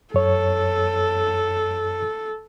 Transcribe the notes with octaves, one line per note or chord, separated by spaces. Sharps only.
F#2 A4 C#5